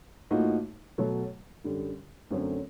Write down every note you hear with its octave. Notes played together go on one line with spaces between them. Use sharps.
A2 F3 A#3 D#4 F#4
B2 F#3 A3
F#2 D3 G3
F#2 D3 F#3 A3 C4